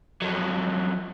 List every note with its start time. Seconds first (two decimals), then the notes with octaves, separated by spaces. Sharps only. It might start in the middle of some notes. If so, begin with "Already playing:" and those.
0.22 F2 F#3